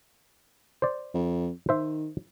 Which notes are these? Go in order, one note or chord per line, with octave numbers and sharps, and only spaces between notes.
C5 D5
F2
D#3 C5 E5